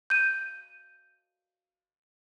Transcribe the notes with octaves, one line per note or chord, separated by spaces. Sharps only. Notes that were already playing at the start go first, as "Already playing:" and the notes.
G6 D#7